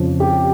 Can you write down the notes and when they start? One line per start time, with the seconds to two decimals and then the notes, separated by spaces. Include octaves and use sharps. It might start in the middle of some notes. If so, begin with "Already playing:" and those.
Already playing: F2 C#3 F3
0.20 G4